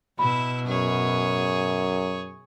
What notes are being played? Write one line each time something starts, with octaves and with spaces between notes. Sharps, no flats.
B2 E4 E5 B5
F#2 G#4 C#5